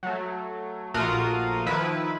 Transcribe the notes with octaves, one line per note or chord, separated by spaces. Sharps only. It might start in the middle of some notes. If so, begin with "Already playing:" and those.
F#3 A3
A#1 A3 F4 F#4 A#4 D#6
D#3 F3 E4 B4